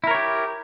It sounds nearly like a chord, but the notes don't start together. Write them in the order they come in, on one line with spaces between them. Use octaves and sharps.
E4 A#4 C#5 G4